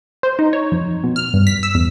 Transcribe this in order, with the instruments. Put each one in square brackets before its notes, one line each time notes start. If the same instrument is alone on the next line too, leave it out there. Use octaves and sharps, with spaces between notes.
[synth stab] C5
D#4
C#5
F2
B2
F6
G2
B6
E6
E2